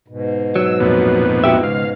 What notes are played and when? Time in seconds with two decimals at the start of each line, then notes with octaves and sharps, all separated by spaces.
0.08 G#2 B2
0.56 F#3 E6
0.80 F2 A#2 B3
1.44 F#4 G4 E5
1.63 C#2 F5